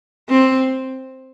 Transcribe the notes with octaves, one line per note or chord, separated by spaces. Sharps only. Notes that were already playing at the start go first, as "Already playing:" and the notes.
C4